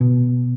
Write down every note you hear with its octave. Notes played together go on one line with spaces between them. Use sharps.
B2